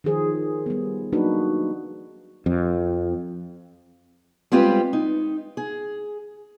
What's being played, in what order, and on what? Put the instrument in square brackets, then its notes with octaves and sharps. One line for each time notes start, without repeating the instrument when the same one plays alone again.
[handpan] D#3 F3 G#4 C5
G3 B3
F#3 A#3 D4 D#4 F#4 B4
[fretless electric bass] F2
[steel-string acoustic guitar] G3 G#3 C4 F4 G4 B4
D#4
G#4